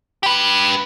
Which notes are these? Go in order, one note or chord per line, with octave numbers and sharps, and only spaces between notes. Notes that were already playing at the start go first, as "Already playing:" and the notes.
G4 B4